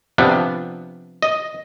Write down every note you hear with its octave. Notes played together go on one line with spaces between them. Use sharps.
C3 F3 B3 D4
D#5